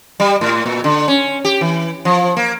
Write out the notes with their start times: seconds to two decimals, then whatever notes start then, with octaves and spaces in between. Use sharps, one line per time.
0.20 G3
0.41 A2
0.66 A#2
0.84 D3
1.08 C#4
1.45 G4
1.61 E3
2.05 F3
2.37 A#3